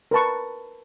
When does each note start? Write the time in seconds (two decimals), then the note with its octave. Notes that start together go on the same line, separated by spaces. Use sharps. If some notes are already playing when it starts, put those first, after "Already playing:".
0.11 A#4 B4 A5 C#6